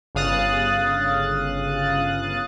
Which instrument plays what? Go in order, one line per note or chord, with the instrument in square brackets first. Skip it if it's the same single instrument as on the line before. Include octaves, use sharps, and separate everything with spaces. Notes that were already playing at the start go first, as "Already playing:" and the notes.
[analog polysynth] G1 C#3 F5 D#6 F#6 A6